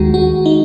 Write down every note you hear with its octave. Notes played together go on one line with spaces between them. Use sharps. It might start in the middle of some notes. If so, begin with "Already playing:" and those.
Already playing: D#2 D#3 G#3 F#4
F#4
D#4